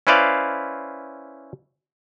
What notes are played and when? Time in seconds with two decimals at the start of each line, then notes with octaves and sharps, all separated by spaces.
0.07 C#4 E4 B4 C5 D5 F5